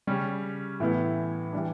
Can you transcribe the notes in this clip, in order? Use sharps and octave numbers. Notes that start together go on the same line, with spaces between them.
C#3 G3 C#4
A2 E3 B3 E4
E3 G3 D4